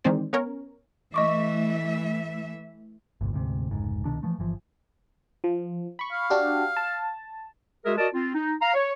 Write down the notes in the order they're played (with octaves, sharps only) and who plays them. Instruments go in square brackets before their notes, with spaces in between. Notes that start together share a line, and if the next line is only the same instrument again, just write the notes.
[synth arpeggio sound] D#3 E3 G#3 C4 C5 D5
B3 C#4 A#4 C#5
[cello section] E3 A3 E5 [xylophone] D#5 C#6 D6
[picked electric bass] G1 C2 A#2
D2 G#2 C3
F1 C#2 G#2
C2 B2 D#3 D4
E3 F3 A3
G1 E3 F3
[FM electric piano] F3
B5 C#6
[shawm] F5
[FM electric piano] D4 F#4 G4
A5
[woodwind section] G#3 F#4 G#4 A#4 E5
F#4 A#4 D5 D#5 A5
C4 F4
D#4
F5 A#5
C#5